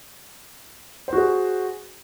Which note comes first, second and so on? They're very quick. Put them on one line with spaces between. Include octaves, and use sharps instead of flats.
C5 F#4 G#4